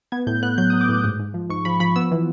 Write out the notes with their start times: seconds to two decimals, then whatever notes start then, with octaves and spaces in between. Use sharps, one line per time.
0.12 B3 G#6
0.27 A2 G6
0.43 B3 F#6
0.58 F#3 G6
0.70 F#3 D#6
0.81 D6
0.89 A2
1.04 G#2
1.19 G#2
1.34 F3
1.50 G#2 C#6
1.65 F3 B5
1.80 F3 B5
1.96 B3 E6
2.11 E3